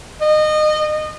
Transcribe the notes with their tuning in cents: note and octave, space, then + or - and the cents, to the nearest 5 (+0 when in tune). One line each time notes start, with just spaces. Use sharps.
D#5 -25